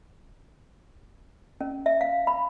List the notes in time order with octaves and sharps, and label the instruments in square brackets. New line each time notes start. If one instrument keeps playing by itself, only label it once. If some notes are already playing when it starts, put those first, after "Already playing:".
[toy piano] C#4
E5
F5
B5